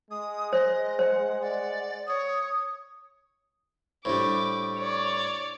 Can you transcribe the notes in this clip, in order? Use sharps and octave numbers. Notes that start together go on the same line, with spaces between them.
G#3 D#6
C5 D#5
C5 F#5
D5 F#5
C#5 D#6
A2 G3 D4 E4 C5 D6
C#5 D5